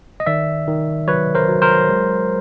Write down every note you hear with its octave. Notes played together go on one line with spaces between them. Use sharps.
D#5
D#3 D5 E5
D#3
F#3 B4 C#5
A#4 C5
F#3
A#4 C5
G#3